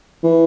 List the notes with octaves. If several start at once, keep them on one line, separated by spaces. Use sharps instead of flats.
E3